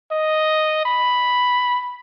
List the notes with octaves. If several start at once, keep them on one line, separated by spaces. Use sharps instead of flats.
D#5
B5